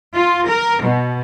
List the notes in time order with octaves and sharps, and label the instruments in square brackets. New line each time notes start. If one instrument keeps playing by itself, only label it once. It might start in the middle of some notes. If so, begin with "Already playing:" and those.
[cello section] F4
A#4
B2